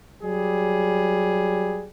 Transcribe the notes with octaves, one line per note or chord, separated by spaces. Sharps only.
F#3 G3 G#4